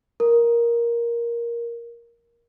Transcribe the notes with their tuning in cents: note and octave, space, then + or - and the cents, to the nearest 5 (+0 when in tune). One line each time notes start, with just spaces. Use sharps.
A#4 +10